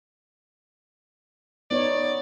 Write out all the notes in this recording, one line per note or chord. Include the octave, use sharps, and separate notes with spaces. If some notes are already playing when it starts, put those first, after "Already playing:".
B3 D#4 C#5 D5